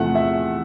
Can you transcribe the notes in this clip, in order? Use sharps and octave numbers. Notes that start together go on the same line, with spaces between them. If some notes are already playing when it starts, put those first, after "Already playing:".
Already playing: E2 C3 F3 A3 F#5
E5